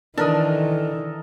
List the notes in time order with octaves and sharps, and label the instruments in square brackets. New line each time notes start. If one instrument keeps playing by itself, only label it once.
[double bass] D#3 [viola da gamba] E3 [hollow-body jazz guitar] D4 [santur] A4 A#4 D#5